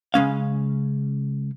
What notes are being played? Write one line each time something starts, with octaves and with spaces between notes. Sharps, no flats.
C#3 G#3 C#4 F5